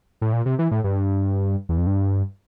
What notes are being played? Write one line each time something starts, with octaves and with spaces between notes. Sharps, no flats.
A2
A#2
C3
E3
A2
G2
E2
F2
G2